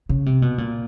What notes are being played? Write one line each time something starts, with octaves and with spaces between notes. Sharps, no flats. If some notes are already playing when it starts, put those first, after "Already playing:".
C#3
C3
B2
A#2